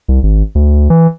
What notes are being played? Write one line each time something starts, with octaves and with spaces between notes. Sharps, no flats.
C2
G#1
D2
E3